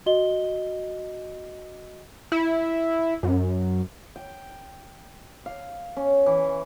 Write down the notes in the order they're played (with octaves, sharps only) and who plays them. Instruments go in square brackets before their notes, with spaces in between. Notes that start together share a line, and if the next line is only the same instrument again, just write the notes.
[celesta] F#4 D#5 G7
[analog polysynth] E4
F#2
[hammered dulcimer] G5
F5
C#4
E3